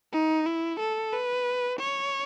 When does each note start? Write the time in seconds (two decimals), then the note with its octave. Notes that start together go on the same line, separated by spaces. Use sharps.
0.13 D#4
0.46 E4
0.79 A4
1.13 B4
1.79 C#5